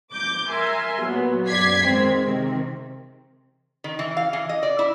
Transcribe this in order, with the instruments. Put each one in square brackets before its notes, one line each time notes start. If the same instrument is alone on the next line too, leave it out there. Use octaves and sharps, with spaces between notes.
[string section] D6 G6
A#4 E5 G#5 C6
A#2 F#3 B3
F#2 F#3 D5 G#6 B6 C7
G#2 D#3 G#3 C4
C3 D#3 C4
[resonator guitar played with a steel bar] D#3
E3
F5
E3
D#5
D5
E4